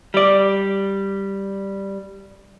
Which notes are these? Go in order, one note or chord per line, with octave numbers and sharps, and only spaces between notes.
G3 D5